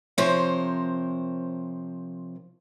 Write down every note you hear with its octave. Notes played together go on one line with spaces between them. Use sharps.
C3 F3 A#4 C5 C#5